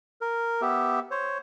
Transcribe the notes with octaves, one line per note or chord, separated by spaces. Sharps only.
A#4
B3 G4 E5
C5 C#5